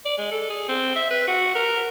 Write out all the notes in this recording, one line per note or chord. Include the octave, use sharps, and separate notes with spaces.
D5
G#3
A4
G#4
C4
E5
B4
F#4
A#4